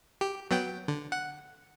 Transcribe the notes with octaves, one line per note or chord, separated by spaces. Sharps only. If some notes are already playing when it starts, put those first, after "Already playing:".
G4
F#3 B3 G5
D3
F#5